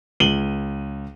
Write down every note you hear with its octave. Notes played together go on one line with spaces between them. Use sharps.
C#2 D#7 F#7 G7